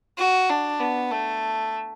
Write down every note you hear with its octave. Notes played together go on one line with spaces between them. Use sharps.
F#4
D4
B3
A3